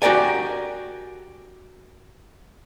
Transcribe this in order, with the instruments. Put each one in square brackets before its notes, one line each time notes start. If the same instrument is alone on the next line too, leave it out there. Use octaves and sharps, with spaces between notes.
[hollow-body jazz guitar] F#4 G4 A#4 D5 G#5